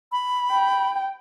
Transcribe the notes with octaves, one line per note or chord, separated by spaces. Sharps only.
B5
G5